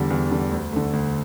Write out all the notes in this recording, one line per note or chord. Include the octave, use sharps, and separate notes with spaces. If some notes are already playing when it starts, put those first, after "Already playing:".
Already playing: E2 D3 G3
E2
D3 G3
D2
D3 A3
D2